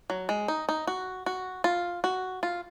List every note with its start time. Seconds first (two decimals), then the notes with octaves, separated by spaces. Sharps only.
0.10 F#3
0.29 G#3
0.48 D#4
0.69 D#4
0.87 F#4
1.26 F#4
1.64 F4
2.04 F#4
2.43 F4